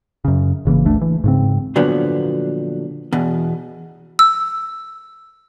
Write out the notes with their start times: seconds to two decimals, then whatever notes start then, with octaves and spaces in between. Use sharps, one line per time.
0.25 F#2 C#3
0.65 G#1 C#3 E3 A#3
0.85 G#1 D2 A3 D4
1.01 E3
1.24 G#2 C#3 C4
1.76 A#2 D3 F3 F#3 B3
3.12 E2 B2
4.19 E6